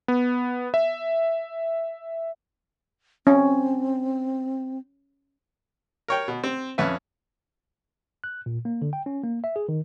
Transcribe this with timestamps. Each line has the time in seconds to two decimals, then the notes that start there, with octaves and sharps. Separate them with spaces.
0.08 B3
0.74 E5
3.27 C4 C#4
6.08 A#4 C#5 G5
6.28 B2
6.44 C4
6.78 F2 C#4 B4 E5
8.24 F#6
8.46 A#2
8.65 A#3
8.82 D3
8.93 G5
9.06 C#4
9.24 A#3
9.44 E5
9.56 G#4
9.69 D#3